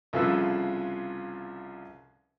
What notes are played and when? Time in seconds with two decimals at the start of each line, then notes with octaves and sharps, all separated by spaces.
0.13 C2 C#3 F3 A4 B4 E6